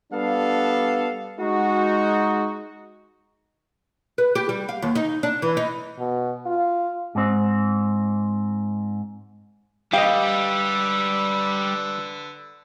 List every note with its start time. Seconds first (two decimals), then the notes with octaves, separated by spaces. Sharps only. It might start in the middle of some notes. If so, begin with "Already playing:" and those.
0.13 G3 B3 D4 A4 F5
1.40 G#3 D#4 F#4
4.18 B4
4.35 G4
4.49 G3
4.69 F5
4.82 D#2
4.95 D#4
5.23 D4
5.42 E3
5.57 D#4
5.99 B2
6.46 F4
7.15 G#2 C4
9.93 D3 G3 G4 B4 D#5 F5 E6